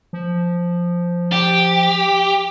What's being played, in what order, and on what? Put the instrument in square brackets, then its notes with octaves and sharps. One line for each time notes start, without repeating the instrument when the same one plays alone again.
[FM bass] F3
[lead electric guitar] G4